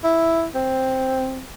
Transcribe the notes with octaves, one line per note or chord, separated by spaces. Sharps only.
E4
C4